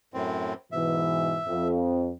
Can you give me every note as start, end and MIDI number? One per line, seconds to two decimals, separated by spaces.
0.14 0.54 42
0.14 0.54 45
0.14 0.54 60
0.72 1.39 44
0.72 1.39 47
0.72 1.39 52
0.72 1.68 76
1.47 2.13 41